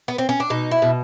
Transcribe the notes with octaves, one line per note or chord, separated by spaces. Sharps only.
B3
C4
C#4
D4
B2 D#4
E4
B2